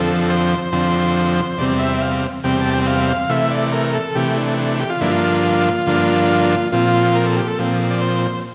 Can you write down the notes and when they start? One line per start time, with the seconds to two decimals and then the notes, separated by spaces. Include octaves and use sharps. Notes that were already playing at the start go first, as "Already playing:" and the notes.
Already playing: F2 D3 F3 C4 A4
0.30 C5
0.72 F2 D3 F3 C4
1.58 E2 C3 G3 C4 D5
1.79 E5
2.01 F5
2.44 E2 C3 G3 C4 G5
2.61 A5
2.73 G5
2.87 F5
3.29 C3 E3 A3 E5
3.51 D5
3.72 A#4
3.94 A4
4.15 C3 E3 A3 G4
4.37 D4
4.58 D4
4.80 G4
4.90 F4
5.01 G2 D3 F3 A#3 D4 E4
5.11 F4
5.87 G2 D3 F3 A#3 D4
6.72 A#2 F3 C4 F4
7.15 A#4
7.26 A4
7.37 G4
7.48 A4
7.58 A#2 F3 C4
7.90 D5
8.01 C5